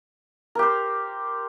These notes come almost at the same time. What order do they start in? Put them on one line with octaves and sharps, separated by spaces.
A#4 G4 C5